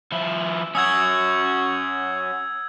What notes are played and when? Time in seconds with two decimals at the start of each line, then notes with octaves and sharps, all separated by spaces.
0.12 F3 E4
0.75 C#4 F#4 D#6 E6 G#6